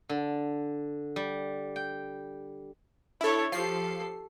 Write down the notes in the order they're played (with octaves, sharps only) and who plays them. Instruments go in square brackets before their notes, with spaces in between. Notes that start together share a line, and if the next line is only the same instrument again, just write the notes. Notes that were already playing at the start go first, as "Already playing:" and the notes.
[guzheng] D3
G3
G5
[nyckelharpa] D4 C#5 [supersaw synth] E4 A4
[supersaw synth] F3 C7 [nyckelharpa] G4 A4